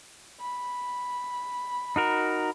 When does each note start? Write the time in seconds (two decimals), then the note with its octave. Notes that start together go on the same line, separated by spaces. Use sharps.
0.40 B5
1.96 D#4 F#4 A#4